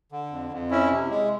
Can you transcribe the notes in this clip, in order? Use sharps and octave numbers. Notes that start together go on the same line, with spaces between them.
D3
F2
F2
C#4 E4
C3
G#3